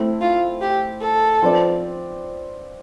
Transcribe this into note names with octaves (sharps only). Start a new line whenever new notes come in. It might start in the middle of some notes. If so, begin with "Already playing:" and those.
Already playing: A3 C4 E4
F4
G4
A4
F3 C4 F4 B4 D5